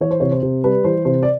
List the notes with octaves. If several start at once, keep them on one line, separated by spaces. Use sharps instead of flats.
E3 C#5
C5
C3 C#5
C5
C3
G3 B4
E3 C5
C3 C5
D5